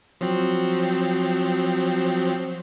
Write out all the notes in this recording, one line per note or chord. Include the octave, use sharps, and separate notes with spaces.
F3 F#3 C4